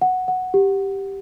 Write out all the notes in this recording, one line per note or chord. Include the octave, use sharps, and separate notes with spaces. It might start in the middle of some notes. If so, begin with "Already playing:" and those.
F#5
F#5
G4